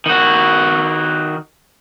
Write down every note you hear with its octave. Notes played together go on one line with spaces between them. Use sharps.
D#3 F#4